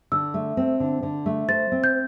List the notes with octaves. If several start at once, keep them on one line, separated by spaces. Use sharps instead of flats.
D3 E6
A3
C4
D3
D3
A3
C5 A6
C4
G6